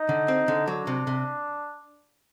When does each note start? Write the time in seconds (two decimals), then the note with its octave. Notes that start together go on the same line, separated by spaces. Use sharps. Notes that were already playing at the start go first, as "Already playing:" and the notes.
Already playing: D#4
0.09 D3
0.28 C4
0.48 D3
0.67 F#3 D4
0.87 C3
1.07 C3